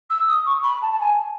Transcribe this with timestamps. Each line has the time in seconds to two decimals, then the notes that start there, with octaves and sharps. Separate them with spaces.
0.10 E6
0.27 D#6
0.46 C#6
0.63 B5
0.81 A5
0.91 A5
0.99 G#5